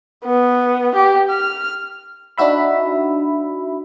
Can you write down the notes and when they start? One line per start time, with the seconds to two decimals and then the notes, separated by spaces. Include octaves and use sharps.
0.25 B3
0.95 G4
1.30 F6
2.38 D4 D#4 F#4 E5 B5